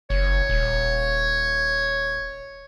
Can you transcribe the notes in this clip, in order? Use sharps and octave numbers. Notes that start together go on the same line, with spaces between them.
F#1 C#5
D#1